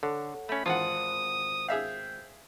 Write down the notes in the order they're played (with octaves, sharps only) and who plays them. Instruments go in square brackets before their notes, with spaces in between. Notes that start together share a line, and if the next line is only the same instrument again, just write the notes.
[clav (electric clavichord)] D3 [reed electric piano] A4 C#5 F#5
[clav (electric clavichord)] A3 C#4 [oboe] B5
[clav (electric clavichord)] G#1 F4 [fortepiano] E3 F#5 [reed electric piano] C5 A5 [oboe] D#6
[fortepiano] G#4 E5 F5 [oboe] G5